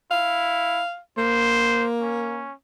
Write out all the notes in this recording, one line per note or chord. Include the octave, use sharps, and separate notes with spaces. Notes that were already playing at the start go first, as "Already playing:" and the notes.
E4 F5
A#3 C5
C#4